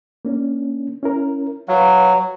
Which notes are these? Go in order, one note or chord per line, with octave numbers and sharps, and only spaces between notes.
A#3 C#4 D4
C#4 E4 A#4
F#3 B4 F5